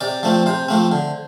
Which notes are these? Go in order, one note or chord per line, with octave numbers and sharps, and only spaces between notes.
C3 D5
F3 A3 C4
C3 C5
F3 A3 C4
D3